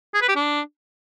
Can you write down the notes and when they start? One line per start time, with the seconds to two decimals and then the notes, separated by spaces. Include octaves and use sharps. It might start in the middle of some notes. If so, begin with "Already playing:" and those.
0.15 G#4
0.22 B4
0.29 G4
0.36 D4